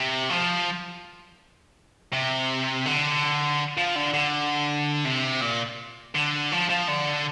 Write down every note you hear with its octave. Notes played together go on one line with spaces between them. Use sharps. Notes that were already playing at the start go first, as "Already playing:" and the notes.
Already playing: C3
F3
C3
D3
F3
D3
D3
C3
A#2
D3
F3
F3
D3